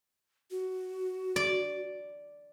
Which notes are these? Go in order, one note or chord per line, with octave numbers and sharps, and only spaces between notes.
F#4
D5